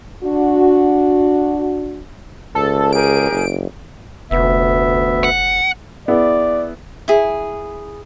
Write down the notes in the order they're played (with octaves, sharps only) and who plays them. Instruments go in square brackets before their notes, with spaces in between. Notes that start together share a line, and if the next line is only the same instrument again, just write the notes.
[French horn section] D4 F#4
[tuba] C#2 [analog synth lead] A4
[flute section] G4 G#4 A#4 [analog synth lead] D7
[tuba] F#1
[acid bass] F1 [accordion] D2 B3 E5
[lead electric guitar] F#5
[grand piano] B3 E4 G#4 [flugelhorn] D5
[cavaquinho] E4 G#4